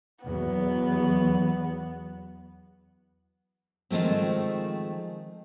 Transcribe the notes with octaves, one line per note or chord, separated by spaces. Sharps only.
E2 F#3 B3
D#3 F3 G#3 A3 C4